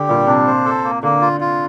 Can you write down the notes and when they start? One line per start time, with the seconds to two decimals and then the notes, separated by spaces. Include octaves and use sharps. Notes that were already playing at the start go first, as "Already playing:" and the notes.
Already playing: D3 G4
0.08 A#2 G3
0.27 C3 D4
0.47 C5
0.66 A4
0.85 A#3
1.03 D3 A#3
1.21 F4
1.41 F4